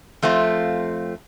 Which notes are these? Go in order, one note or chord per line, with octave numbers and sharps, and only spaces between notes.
F2 A3 C4 F4